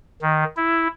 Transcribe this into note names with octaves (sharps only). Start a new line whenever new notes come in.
D#3
E4